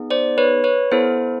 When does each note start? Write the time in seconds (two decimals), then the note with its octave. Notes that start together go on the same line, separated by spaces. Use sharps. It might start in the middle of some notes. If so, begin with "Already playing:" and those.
Already playing: B3 D#4 G#4
0.10 C5 D5
0.38 B4 C#5
0.64 B4 C#5
0.91 B3 E4 A4 C5